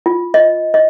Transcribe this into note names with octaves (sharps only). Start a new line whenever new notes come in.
F4
D#5
D#5